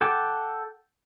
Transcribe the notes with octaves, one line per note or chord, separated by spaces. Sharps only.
A4 F#5 G5 A5 D6